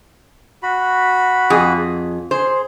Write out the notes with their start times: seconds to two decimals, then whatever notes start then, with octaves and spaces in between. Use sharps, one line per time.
0.63 F#4 B5
1.50 F2 G#4
2.31 G#4 C5